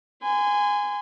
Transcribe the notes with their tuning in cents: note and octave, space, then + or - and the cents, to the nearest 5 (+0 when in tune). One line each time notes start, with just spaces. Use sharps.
G#5 -10 C6 -35